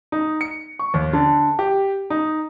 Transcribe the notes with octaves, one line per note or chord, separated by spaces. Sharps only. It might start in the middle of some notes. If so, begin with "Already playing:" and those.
D#4
C#7
C#6
D#2
D3
G4
D#4